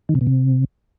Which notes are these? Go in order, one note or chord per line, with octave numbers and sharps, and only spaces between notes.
D#3
C3
B2
C3